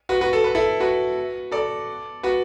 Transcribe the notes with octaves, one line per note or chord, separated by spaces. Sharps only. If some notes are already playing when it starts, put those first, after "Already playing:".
F#4 B4
F#4 B4
A4
B4
E4 A4
F#4 B4
A4 D5
F#4 B4